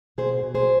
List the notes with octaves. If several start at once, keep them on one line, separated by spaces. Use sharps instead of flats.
B2 G#4 C5
B2
G#4 C5